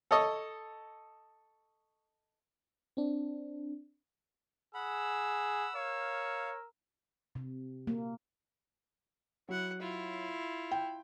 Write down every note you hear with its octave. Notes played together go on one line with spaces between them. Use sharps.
A4 C#5 D#5
C4 D4
G#4 F#5 B5 E6
A#4 C#5 F5
C3
A#3
F#3 E4 F#5
E4 F4
G5